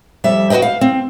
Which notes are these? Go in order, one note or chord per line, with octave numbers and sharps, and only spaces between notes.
F2 G3 E5
F#4 G#4 B4 D#5 G5
F5
C4